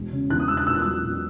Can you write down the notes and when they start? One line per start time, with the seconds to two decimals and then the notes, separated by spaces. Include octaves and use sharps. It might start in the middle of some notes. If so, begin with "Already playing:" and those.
Already playing: E1
0.12 C#3
0.30 E2 F#6
0.40 D#6
0.48 E1 E6
0.57 F#6
0.66 A#2 E6
0.75 F#6
0.82 F#3 E6
1.03 A#2